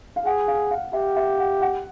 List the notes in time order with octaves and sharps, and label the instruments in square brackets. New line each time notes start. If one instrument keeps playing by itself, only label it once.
[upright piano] F5
[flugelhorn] G#4 [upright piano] F#5
[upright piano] F5
F5
[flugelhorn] G4 [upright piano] E5
[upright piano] E5
F#5
F#5